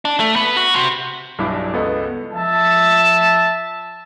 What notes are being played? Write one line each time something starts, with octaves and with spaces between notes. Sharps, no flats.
D4
A3
B3
F#4
C3
B1 G2 D4 E4 D6
C#2 B3 A4 D#5
F3 E5 A5